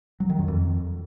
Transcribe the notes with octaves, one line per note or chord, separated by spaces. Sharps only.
F#3
D#3
F#2
F2